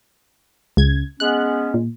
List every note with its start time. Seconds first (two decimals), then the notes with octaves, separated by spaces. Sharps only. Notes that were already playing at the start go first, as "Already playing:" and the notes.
0.77 C#2 C#3 G#6
1.20 G#3 B3 C#4 F#6
1.74 A#2